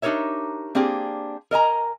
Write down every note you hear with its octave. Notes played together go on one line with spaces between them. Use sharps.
D4 D#4 G4 A#4 C#5 E5
A#3 C4 D4 G4 G#4
A#4 D#5 G#5 A#5